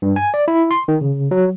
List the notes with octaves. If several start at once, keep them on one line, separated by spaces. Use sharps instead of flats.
G2
G#5
D5
E4
C6
D#3
C#3
F#3